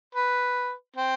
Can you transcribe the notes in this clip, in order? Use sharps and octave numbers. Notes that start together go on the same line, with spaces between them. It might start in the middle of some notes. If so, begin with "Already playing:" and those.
B4
C4